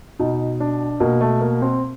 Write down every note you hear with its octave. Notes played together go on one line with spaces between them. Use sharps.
B2 D#4
D4
B2 A#3
A3
A#3
C4